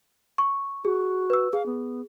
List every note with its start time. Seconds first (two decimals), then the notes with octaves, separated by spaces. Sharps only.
0.38 C#6
0.85 F#4 G#4
1.30 B4 E6
1.53 G#4 F5
1.66 B3